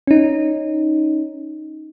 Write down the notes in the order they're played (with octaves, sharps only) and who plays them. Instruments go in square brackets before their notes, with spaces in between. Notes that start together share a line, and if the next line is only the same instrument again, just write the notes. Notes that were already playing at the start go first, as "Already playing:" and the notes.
[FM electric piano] C#4 D#4